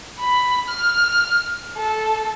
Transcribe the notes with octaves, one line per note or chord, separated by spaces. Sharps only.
B5
F6
A4